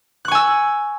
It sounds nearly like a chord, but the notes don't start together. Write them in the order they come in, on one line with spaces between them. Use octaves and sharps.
F#6 C#6 G#5 E6